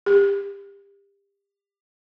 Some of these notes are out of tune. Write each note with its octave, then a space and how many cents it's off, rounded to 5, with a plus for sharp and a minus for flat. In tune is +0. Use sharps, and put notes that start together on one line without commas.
G4 +30